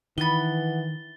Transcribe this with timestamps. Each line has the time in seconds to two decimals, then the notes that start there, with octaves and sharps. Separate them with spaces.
0.18 D#3 E3 B3 F#4 B5 A6 G7